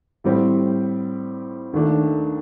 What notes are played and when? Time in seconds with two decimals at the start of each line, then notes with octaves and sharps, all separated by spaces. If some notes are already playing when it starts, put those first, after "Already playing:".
0.24 A2 G3 C4 G4
1.73 D#2 D#3 A3 D4